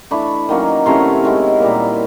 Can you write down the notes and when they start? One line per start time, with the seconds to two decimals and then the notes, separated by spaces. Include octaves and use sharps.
0.11 E3 A3 D4 B5 C#6
0.49 D#3 F#3 A#3 C#4
0.86 C3 E3 A3 C#4 A#5 C6
1.23 D#3 G#3 B3 E4
1.60 A#2 G3 A#3